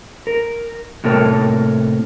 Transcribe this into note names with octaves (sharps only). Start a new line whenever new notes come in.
A#4
A2 C3 A#3 A4 A#4 C#5